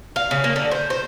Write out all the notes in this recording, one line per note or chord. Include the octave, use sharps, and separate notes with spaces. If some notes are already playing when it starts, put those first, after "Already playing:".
F5
C#3
A#3
D3
C5
C5